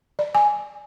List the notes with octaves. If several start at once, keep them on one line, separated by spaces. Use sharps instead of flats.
D5
G#5